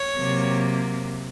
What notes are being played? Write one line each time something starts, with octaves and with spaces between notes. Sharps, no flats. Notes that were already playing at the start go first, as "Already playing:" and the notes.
Already playing: C#5
C3 F#3 A#3